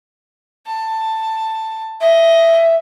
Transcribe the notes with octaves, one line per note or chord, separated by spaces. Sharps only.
A5
D#5 E5